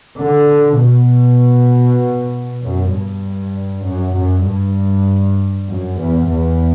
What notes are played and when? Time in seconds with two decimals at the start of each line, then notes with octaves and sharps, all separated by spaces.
0.18 D3
0.79 B2
2.63 F#2
2.93 G2
3.85 F#2
4.16 F#2
4.46 G2
5.69 F#2
5.99 E2
6.30 E2